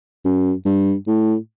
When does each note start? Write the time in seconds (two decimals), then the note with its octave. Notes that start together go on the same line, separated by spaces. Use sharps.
0.25 F#2
0.66 G2
1.07 A2